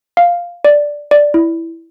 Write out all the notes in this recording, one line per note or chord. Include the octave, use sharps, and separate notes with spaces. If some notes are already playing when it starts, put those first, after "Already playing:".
F5
D5
D5
E4